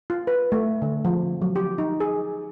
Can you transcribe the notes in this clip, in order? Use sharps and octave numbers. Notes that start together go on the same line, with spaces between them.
F4
B4
A3
D3
F3
F#3
G4
D#4
G#4